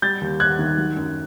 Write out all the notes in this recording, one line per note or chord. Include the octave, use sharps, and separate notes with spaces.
G3 G6 A6
D#2
D#2 F#6 G#6
D#3
F#3
F#2